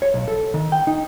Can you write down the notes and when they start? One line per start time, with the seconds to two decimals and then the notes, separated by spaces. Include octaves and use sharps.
0.02 C#5
0.14 B1
0.28 A4
0.54 D#3
0.72 G5
0.87 D#4